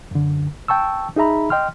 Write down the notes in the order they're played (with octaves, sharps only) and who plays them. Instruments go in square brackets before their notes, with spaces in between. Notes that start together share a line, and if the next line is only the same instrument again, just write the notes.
[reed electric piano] F#2 D3
G5 A5 C#6 E6
D#4 G#4 E5 A#5 B5
D#5 G5 C6 F6